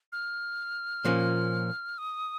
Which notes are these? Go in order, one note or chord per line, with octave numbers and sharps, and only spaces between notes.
F6
A#2 F3 A#3 C#4
D#6